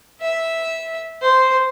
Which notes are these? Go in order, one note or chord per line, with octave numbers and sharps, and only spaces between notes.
E5
C5